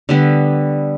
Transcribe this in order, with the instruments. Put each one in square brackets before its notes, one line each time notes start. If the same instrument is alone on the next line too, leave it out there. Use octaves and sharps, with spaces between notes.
[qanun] D3 G3 B3